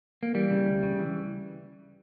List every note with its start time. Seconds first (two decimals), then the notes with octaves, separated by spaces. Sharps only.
0.23 A#3
0.34 E3 G3
0.51 C#3
0.66 D2
0.83 C#3
0.99 E3